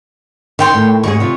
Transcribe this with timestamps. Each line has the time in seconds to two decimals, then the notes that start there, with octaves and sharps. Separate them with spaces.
0.59 D#3 C#5 G5 C6
0.74 A2
1.03 D#2 G#2 G#4 C#6
1.20 C3 F4